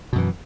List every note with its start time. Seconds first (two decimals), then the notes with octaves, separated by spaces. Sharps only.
0.13 B2
0.15 F#2
0.18 E3